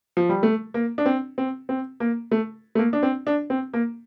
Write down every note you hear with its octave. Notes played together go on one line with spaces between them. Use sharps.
F3
G3
A3
A#3
D4
C4
C4
C4
A#3
A3
A3
A#3
D4
C4
D4
C4
A#3